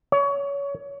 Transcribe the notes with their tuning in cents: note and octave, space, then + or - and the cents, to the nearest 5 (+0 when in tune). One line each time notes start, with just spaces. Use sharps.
C#5 +25